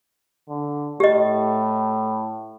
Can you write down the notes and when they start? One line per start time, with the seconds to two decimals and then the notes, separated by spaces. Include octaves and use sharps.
0.49 D3
1.00 A2 G4 D#5